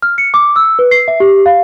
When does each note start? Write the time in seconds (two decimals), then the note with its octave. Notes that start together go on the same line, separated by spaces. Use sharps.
0.02 F6
0.18 C#7
0.34 D6
0.56 E6
0.79 B4
0.91 C7
1.08 E5
1.20 G4
1.46 F5